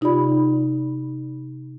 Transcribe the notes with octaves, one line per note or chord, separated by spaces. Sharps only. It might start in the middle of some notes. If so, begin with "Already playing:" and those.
C3 D#4 F4 G4 D5 B5